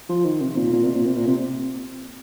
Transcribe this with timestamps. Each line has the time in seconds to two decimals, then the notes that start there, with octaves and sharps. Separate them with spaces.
0.09 F3
0.25 D#3
0.41 C3
0.56 A#2
0.73 A#2
0.84 C3
0.95 A#2
1.06 C3
1.16 A#2
1.27 C3